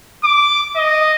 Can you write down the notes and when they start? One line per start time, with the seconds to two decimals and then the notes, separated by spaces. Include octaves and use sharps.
0.24 D6
0.76 D#5